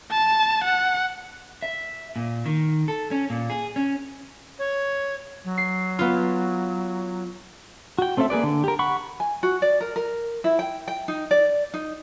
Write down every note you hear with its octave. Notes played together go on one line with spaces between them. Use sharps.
A5
F#5
E5
A#2
D#3
A4
C#4
A#2
G#4
C#4
C#5
F#3
C7
B3 F4
F#4 G5
A3 C4 C#4 A4 E5
A#3 G#4 B4 D5
D3
G4 A#4
F#5 B5 C#6
G#5
F#4
D5
A#4
A#4
E4
G5
G5
D#4
D5
D#4